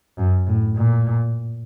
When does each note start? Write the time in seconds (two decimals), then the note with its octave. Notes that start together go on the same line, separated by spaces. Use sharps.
0.18 F#2
0.47 A2
0.76 A#2